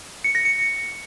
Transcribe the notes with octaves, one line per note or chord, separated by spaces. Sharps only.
C#7
A#6
C#7